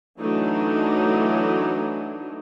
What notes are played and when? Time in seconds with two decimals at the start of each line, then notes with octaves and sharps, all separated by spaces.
0.19 E3 F#3 A3 D4 D#4